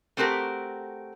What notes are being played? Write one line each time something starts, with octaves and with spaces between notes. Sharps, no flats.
A3 C4 F#4 G4 A#4